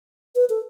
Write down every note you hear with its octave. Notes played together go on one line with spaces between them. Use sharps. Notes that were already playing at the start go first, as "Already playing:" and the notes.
B4
A4